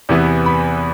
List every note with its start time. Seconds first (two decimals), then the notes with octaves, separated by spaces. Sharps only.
0.09 E2 C3 E3 B3 E4
0.46 B5